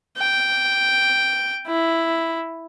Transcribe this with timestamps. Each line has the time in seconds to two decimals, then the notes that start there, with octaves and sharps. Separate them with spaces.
0.18 G5
1.67 E4